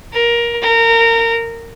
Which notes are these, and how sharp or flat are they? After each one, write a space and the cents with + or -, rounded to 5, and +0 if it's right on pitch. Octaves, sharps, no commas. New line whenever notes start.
A#4 +15
A#4 -25